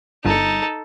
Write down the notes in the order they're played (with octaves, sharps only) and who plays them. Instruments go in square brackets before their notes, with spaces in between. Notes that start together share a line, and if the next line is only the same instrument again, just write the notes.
[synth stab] G1 [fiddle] D#4 A4